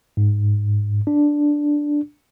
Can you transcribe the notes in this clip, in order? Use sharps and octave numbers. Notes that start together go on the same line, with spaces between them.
G#2
D4